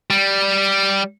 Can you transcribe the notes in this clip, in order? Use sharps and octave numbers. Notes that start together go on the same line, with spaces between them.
G3